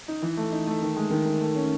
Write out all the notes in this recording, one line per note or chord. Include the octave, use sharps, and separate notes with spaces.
D#4
E3
A3
D#4
A3
D#3
G#3
D#3
D#3
A3
C#4